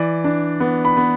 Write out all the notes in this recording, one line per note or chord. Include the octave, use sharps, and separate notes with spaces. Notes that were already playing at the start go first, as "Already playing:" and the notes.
Already playing: E3 D5
D4
B3
B5
B3